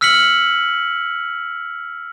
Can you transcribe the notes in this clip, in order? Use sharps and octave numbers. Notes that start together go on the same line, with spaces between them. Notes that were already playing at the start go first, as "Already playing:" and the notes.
E6 F6 B6 C#7 F#7